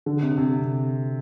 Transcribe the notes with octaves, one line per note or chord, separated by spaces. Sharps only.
D3
C3
C3